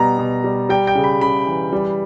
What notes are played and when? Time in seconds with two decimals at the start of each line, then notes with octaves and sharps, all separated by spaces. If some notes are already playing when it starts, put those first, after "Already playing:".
Already playing: B2 G3 A#5
0.19 B2
0.44 G3
0.69 G3 G5
0.87 G5
0.95 C#3
1.04 B5
1.21 C#3 B5
1.47 E3
1.73 G3